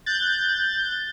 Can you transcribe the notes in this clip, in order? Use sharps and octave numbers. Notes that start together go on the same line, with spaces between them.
F#6 G6 A6